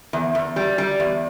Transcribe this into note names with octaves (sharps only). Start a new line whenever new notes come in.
E2
E2
G3
G3
E2